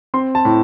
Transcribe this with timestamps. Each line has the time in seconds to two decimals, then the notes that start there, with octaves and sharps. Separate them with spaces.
0.14 C4 C6
0.35 A5
0.45 A2